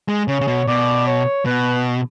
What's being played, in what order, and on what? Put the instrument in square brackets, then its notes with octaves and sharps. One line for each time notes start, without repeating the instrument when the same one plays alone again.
[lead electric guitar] G#3
[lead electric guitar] C#3 [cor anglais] C#5
[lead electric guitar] C#3
B2
[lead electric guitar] B2 [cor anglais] D5
[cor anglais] C#5
[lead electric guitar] B2 [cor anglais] B4